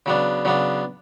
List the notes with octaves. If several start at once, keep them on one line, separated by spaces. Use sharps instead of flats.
C#3 F#3 B3 D4
C#3 F#3 B3 D4